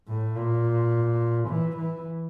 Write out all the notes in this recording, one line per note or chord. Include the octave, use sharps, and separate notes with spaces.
A2
A#2
E3
E3